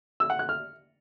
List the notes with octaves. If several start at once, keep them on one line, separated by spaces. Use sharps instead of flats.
E6
F#5
F#6
F6